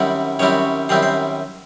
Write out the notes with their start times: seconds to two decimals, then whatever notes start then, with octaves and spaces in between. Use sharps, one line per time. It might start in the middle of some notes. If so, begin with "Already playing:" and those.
Already playing: F#2 D#3 G3 C4 E4 F#5
0.39 F#2 D#3 G3 C4 E4 C#5
0.89 F#2 D#3 G3 C4 E4 C5
1.03 C5